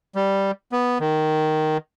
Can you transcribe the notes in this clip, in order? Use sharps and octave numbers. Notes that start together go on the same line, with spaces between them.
G3
B3
D#3